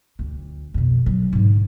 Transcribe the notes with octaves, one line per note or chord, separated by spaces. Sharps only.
D2
F2 B2
F3 F#3
G#2 D3